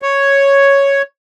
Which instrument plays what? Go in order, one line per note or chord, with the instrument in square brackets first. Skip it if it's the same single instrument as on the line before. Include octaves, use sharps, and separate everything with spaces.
[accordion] C#5